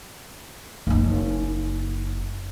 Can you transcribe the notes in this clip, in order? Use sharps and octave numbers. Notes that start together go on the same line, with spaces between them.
F#1 D#4